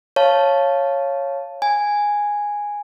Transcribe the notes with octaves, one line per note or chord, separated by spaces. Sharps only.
C#5 F5 A5
G#5